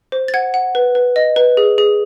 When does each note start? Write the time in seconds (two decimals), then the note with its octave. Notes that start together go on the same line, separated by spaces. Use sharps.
0.12 C5
0.28 A6
0.34 F#5 G#6
0.54 F#5
0.75 B4
0.95 B4
1.16 D#5
1.36 B4
1.57 G#4
1.78 G#4